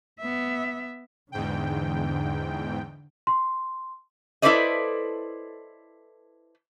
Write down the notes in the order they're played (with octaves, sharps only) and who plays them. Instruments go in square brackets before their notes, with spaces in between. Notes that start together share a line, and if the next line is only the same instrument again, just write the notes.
[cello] B3 E5
[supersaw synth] E2 G#2 G5 [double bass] D3
[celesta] C6
[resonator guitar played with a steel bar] E4 A4 B4 C5 D5 D#5